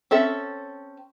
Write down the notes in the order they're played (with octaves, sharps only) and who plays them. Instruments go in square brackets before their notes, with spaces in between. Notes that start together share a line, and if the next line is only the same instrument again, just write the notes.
[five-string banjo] C4 C#4 A4 E5